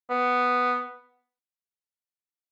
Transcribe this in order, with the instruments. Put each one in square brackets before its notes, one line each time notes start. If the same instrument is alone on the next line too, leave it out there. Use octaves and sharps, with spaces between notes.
[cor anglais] B3